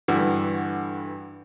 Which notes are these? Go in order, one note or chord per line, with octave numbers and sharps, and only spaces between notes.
G2 D3 E3 F#4